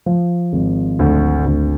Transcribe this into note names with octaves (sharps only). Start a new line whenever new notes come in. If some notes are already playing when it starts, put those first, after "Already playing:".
F3
G#1
D2
D2